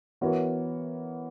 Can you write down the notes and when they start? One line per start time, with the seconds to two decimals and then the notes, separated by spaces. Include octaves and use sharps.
0.21 E3 B3 F#4 A#4 C#5